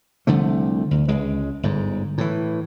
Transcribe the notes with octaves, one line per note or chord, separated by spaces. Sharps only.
C2 D3 F3 A3
D2
C#2 G#3
G1 G#2
A2 E3